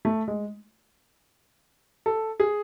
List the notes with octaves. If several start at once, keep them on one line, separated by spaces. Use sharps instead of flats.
A3
G#3
A4
G#4